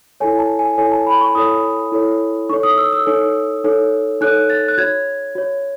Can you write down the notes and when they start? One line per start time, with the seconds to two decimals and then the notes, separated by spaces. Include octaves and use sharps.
0.20 E4 A4 C#5 G#5
0.39 A5
0.59 G#5
0.78 E4 A4 C#5 G#5
0.92 A5
1.07 B5
1.21 C#6
1.35 E4 A4 C#5 D#6
1.92 E4 A4 C#5
2.49 D#4 A4 C#5 C#6
2.63 D#6
2.78 E6
2.92 E6
3.07 D#4 A4 C#5
3.64 D#4 A4 C#5
4.21 D#4 A4 C#5 F#6
4.50 A6
4.68 F#6
4.78 F#4 C#5 G#6
5.35 F#4 C#5